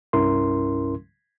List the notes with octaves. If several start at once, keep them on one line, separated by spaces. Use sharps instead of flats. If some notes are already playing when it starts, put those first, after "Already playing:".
C2 G2 C#4 E4 A#4 C6